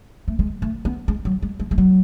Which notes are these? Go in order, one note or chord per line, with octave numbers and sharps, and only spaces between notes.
A3
G#3
A3
B3
G#3
F#3
G#3
G#3
G#3
F#3